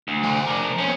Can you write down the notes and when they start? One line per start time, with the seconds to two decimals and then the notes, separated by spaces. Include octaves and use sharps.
0.08 D2
0.23 F3 C5 G#5
0.47 D4 A#4
0.78 A#3 B3 C#4 C5